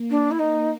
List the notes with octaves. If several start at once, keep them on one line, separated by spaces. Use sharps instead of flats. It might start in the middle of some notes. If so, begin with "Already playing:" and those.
Already playing: A#3
D4
E4
D#4